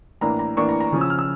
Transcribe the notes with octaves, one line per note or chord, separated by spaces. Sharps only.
A2 E3 A#3 D4 A#5
A#5
A2 E3 A#3 D4 C#6
A#5
A#5
C#3 F3 C#4
E6
F6
E6